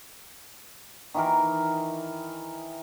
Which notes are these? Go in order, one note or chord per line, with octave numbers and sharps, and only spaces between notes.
D#3 E3 A#4